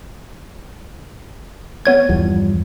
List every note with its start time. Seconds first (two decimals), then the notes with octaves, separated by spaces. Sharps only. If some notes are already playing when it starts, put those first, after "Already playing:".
1.85 B3 C#5 G#6
2.09 E2 G2 F3